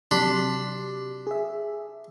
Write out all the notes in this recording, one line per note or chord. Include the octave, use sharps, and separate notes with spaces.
C3 F#3 D4 G4 B5 C6
G#4 E5